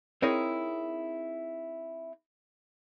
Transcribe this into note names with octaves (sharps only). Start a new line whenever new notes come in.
C4 D#4 E4 G#4 A#4 C#5